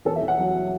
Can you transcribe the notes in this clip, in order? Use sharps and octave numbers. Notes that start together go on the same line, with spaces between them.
E2 A4
E5
E2
F#5
F#3
F#3